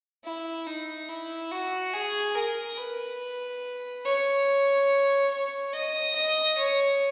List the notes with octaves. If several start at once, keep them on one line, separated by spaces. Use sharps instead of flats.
E4
D#4
E4
F#4
G#4
A#4
B4
C#5
C#5
D#5
D#5
C#5